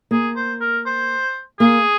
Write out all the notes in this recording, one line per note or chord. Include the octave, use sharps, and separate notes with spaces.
A#3 G#4
C5
A#4
C5
A#3 G#4